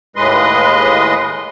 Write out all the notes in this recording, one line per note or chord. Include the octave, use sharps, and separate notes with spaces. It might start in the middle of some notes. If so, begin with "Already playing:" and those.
D#2 A2 G#3 B4 D#5 C6